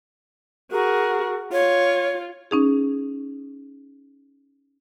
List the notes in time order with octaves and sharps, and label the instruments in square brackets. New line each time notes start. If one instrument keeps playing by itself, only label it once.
[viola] F#4 G#4 [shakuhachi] A#4
[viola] F4 [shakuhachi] C#5
[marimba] C#4 D#4 G#4